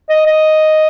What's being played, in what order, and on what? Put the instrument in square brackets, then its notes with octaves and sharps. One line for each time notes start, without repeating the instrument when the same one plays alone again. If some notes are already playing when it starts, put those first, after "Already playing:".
[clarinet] D#5
D#5